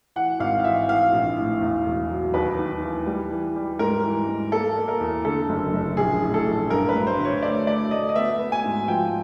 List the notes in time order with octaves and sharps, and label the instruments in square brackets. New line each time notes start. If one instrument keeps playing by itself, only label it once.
[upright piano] E3 F#5
G#1 F5
F5
E3 E5
E3 F5
A#1
A2
E2
E1
F#3
D#2 B4
D#2
E3
G3
E3
G3
G#2 A#4
E3
G#2
A#3 A4
A#3
A#4
E2
D3 A4
F#1
F#1
A#1 G#4
A2
A4
A#1
G2 A#4
B4
G2
C5
D3
C#5
A3 D5
A3 D5
A3 D#5
D#5
B3 E5
B3
G#5
G#2
F3 G5